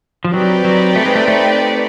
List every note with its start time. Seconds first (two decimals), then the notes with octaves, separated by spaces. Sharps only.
0.25 F3
0.34 F#3 C4 D#4 G4 B4 D5
0.65 F#3
0.96 A3
1.06 G#3
1.15 A3
1.28 A3